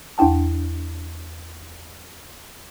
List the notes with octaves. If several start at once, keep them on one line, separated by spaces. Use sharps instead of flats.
E2 D4 E4 G5 A5